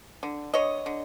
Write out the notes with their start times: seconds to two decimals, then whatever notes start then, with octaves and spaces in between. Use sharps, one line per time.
0.23 D3
0.54 D3 C#5 D#5
0.86 D3